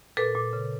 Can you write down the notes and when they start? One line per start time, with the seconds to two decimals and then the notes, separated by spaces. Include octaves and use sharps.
0.17 A#2 A4 B4
0.35 A#2
0.53 C#3